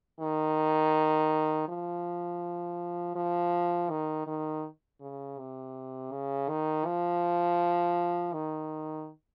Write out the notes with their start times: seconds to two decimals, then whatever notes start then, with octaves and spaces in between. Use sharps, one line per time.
0.20 D#3
1.69 F3
3.16 F3
3.90 D#3
4.27 D#3
5.01 C#3
5.38 C3
6.11 C#3
6.49 D#3
6.86 F3
8.33 D#3